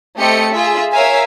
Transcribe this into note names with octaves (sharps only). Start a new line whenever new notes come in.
A3 C4 G4 D#5 C#7
F4 G#4 E5
A#4 C#5 E5 F5 G#5